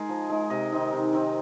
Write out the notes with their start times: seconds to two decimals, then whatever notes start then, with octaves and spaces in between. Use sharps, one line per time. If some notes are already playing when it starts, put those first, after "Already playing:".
Already playing: G#3 D#4 G#4 A#4
0.09 F3
0.29 G#3 D#4
0.50 C3 D#5
0.72 D#3 C4 D#4
0.93 C3
1.13 D#3 C4 D#4